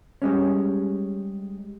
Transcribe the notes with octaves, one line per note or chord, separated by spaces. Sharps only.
G3 G#3 C#4